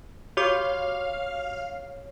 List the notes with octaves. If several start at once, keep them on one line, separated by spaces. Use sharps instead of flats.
F#4 G4 C#5 F5 D6